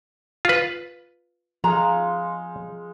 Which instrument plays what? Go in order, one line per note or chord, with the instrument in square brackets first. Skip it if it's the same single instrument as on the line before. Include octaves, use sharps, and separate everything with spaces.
[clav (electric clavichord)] F4 B4
[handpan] F3 [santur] G#3 D#4 F5 [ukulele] A#5